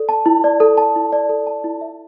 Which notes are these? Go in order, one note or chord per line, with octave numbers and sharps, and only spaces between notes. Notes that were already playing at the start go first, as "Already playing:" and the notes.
Already playing: A4 D5
A5
E4
D5
A4
A5
E4
D5
A4
A5
E4
E5